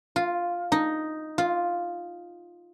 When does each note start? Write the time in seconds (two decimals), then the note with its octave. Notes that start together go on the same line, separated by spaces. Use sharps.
0.16 F4
0.72 D#4
1.38 F4